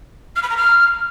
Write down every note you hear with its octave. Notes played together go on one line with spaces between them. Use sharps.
F6
B5
A#5
F6